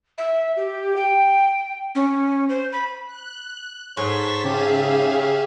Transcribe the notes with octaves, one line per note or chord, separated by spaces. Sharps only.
E5
G4
G5
C#4
C5
B5
F#6
G#2 C#5 A5 C6 C#6 B6
C#3 G4 G#4 E5 F5